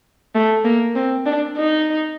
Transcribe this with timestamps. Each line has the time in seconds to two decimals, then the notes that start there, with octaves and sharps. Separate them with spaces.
0.35 A3
0.65 A#3
0.95 C4
1.26 D4
1.57 D#4